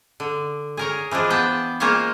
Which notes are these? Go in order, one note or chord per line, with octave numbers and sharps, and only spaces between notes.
D3
G#4 A#4 C#5
E3 F3 G#3 D4
B3 G5 A5
G#3 A#3 F4 C5 C#5 F5